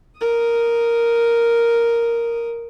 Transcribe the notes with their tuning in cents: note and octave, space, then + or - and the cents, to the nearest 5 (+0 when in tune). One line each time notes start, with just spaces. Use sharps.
A#4 +0 D#6 +0